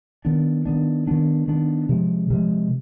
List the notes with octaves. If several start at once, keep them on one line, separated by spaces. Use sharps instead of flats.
D#3 B3 D4
D#3 B3 D4
D#3 B3 D4
D#3 B3 D4
C3 F3 G#3
C3 F3 G#3